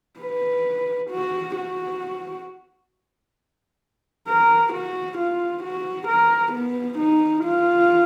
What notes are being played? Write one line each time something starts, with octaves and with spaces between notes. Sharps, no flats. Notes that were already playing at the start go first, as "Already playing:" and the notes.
B4
F#4
F#4
A#4
F#4
F4
F#4
A#4
B3
D#4
F4